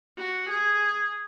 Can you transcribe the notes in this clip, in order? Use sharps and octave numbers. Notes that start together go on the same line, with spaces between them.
F#4
G#4